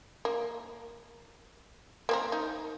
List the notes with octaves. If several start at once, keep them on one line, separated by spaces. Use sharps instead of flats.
A#3
A#3 C4 A#4
D#4